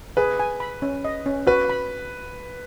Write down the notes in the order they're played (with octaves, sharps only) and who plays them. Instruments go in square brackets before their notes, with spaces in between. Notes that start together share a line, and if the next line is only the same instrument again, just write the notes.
[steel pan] G#4 [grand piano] B4
[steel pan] G#5
B5
C#4
D#5
C#4
[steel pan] F#4 [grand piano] B4
[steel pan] B5